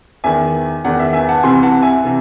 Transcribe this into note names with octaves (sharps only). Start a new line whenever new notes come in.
E2 D#3 E5 G#5
E2 D#3 F#5
E5
E5 G#5
F#5 A5
C2 C3 E3 G#5 C6
F#5 A5
E5 G#5
C3 E3